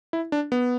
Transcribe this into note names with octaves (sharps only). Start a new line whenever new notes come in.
E4
D4
B3